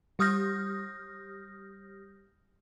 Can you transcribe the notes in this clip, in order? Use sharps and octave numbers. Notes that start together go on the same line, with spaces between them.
G3 G4 D#6 F6 G6 A#6